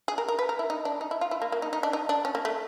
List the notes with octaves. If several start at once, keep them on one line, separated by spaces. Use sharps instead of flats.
G#4
A#4
A#4
B4
A#4
E4
D#4
D4
D#4
E4
F4
E4
A#3
A#3
D#4
D#4
D4
D#4
D4
C#4
A#3
A3